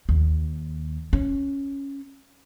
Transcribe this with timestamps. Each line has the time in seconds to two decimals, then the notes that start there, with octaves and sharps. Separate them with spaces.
0.09 D#2
1.13 C#4